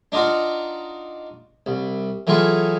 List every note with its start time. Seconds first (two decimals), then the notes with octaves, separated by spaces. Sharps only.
0.12 D4 D#4 F4 F#4
1.66 C2
2.27 E3 F#3 A3 F4 G#4